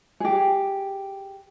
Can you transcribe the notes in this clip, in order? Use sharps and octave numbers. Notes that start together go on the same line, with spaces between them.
G4 G#4